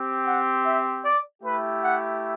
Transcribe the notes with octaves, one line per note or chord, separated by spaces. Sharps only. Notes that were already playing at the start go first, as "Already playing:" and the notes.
Already playing: C4 G4
F#5
E5
D5
A3 E4 G4 B4
F#5